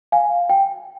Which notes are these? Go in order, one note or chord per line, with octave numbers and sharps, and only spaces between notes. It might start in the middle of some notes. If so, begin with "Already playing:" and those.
F5 G#5
G5